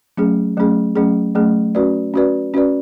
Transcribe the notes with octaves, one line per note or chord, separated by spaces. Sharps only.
F#3 A3 C#4 G#4
F#3 A3 C#4 G#4
F#3 A3 C#4 G#4
F#3 A3 C#4 G#4
C#4 F#4 B4 D5
C#4 F#4 B4 D5
C#4 F#4 B4 D5